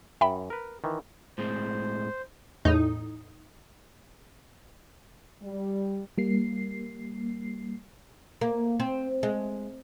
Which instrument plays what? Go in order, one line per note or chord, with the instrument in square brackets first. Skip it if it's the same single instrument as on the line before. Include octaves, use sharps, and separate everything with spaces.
[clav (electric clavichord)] F#2 [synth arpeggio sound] E5 G5 B5
[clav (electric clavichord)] A#4 B4
D#3 E3
[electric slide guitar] A2 G#3 C4 [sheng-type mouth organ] C5
[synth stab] E2 A2 D#4
[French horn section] G3
[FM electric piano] G3 A#3 C7
[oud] A#3
C4
G#3